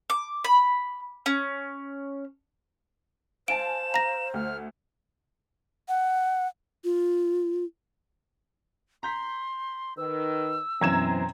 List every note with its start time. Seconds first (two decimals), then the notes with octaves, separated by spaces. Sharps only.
0.10 D6
0.44 B5
1.26 C#4
3.48 C5 F5 G#5 A5 D7 E7
3.94 F5 A#5 A#6
4.34 D2 F6
5.89 F#5
6.84 F4
9.03 A#5 C6 G6 B6
9.97 D#3 B4 E6
10.81 F#2 B2 E3 C4 A#5 G#6 E7